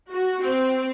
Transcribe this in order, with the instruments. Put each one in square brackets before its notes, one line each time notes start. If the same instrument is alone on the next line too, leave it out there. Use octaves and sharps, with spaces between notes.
[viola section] F#4
C4